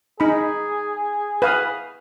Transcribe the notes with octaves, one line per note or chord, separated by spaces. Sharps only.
D#4 G#4 B5
B4 F5 D#6